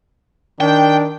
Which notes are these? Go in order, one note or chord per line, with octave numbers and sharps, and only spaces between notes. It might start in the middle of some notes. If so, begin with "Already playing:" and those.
D#3 D4 G5